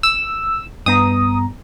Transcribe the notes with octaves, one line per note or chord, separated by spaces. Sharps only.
E6
G2 B3 A#5 D#6